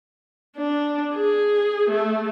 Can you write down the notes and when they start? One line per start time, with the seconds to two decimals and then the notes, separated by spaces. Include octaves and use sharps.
0.57 D4
1.13 G#4
1.89 A3